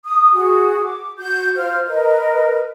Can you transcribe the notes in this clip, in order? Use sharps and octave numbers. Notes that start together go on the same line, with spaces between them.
D#6
F#4 G#4
D6
F#4 G6
F4 C5 F6
A#4 B4 D#5